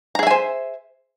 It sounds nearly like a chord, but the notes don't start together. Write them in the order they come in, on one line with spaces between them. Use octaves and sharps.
A#5 G#4 E5 G#5 C5